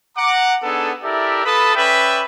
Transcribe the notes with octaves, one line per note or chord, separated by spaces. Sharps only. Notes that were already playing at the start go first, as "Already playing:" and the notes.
F#5 A#5 D6
B3 D4 D#4 G#4 A4
E4 G4 A4 A#4 D5 E5
F4 A4 B4 A5 B5 D#6
C#4 B4 D5 E5 G5 B5